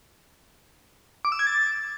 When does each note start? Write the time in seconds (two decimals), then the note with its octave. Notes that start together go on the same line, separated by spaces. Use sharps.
1.25 D6
1.32 E6
1.39 G#6
1.47 A6